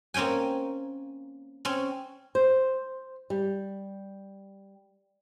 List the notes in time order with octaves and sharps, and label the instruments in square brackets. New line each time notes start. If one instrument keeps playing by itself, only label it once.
[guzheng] A#3 C4 C#4 G5 G#5
C4 C#4
[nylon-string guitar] C5
G3